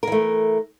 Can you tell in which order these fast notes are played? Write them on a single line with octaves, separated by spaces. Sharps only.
A#4 E3 A3